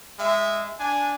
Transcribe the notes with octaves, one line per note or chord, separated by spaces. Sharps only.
G#3 E5
D4 G#5